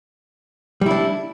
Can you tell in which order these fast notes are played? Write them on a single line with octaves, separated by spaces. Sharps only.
G3 E4 D4